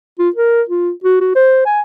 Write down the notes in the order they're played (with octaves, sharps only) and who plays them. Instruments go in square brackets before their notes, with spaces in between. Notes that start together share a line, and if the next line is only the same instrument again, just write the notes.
[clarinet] F4
A#4
F4
F#4
F#4
C5
G#5